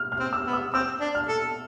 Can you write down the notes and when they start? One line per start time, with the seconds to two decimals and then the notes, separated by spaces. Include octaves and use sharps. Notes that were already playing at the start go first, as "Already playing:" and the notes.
Already playing: F6
0.12 F6
0.19 C4
0.33 E6
0.47 B3
0.53 E6
0.73 C4 E6
1.00 D4
1.15 F6
1.28 A4